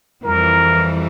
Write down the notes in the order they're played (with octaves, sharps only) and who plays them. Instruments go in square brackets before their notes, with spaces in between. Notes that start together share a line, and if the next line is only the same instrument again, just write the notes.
[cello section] F2 E3 G3 [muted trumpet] A#4